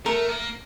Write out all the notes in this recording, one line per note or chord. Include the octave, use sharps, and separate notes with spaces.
A3 A#4
A#3